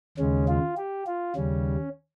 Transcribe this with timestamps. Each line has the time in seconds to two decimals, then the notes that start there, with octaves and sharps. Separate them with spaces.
0.18 D#2 C#3 G#3 C#4
0.48 F4
0.77 G4
1.07 F4
1.36 D#2 C#3 G3 C#4